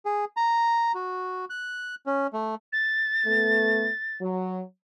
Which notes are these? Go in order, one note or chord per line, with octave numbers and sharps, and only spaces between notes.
G#4
A#5
F#4
F#6
C#4
A3
A6
A3 B3
F#3